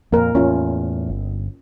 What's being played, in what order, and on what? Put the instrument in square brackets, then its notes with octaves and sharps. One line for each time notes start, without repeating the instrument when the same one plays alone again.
[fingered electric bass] F2 A#2 [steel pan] A#3 A#4
[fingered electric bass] E2 A2 [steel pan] C#4 F4
[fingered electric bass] G1